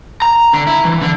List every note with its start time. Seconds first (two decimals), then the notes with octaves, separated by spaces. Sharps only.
0.22 A#5
0.53 D3
0.67 E4
0.85 E3
1.02 D3